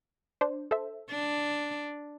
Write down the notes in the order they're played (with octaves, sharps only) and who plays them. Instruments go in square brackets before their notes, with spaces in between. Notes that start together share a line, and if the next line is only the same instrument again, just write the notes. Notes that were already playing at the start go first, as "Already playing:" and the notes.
[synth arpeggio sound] D4 C5
A4 C5 E5
[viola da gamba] D4